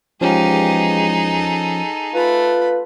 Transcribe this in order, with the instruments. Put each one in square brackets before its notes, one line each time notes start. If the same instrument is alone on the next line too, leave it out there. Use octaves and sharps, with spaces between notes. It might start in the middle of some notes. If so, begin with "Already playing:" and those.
[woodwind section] E2 G#3 [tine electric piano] F3 C#4 [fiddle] D#4 G#4 [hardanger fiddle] G4 F5
[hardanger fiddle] A4
[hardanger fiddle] A3 B5 [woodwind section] F4 B4